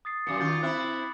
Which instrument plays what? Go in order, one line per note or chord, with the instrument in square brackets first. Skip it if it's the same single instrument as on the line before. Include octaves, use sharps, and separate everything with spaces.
[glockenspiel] D#6 A6 C7
[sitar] F#2 A#2 [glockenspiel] C#7
[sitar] D#3 F4 [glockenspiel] D6 G6 A6
[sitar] C4 E4 [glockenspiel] B5 F#6